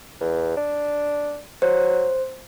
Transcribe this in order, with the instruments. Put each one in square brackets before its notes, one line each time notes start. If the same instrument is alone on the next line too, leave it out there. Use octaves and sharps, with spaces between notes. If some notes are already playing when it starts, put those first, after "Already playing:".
[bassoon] E2
D4
[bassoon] F#3 [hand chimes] C5